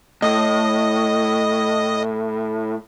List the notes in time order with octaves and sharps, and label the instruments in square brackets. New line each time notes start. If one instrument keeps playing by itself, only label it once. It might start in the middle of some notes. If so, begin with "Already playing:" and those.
[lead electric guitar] A2 [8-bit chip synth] D#5 D#6